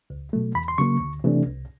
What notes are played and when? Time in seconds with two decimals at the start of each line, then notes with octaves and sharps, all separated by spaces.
0.10 C#2
0.33 B2 F#3 A3
0.55 E2 B5
0.68 C6
0.78 C#3 F#3 A#3 C#6
1.00 D2
1.24 C3 E3 A3 D4
1.46 C2